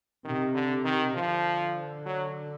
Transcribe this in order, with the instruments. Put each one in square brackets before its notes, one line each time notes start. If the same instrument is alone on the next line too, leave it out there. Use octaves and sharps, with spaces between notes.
[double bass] C3 [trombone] D#3
[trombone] D3
D#3
[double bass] D3 [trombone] F3
[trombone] F#3